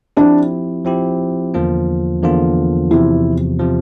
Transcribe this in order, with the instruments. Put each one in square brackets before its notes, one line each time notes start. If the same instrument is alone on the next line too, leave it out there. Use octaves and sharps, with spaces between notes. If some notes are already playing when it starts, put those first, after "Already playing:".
[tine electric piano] F3 C4 E4 G4 [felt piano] D4
[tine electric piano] F3 C4 E4 G4
E2 D3 F3 A#3 F4
E2 D3 F3 A#3 F4
[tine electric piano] E2 C3 F3 [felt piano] E4
[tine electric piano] C3 F3